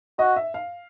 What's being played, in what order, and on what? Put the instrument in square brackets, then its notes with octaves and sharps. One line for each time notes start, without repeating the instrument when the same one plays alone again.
[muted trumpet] F#4 [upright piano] D#5
[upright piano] E5
F5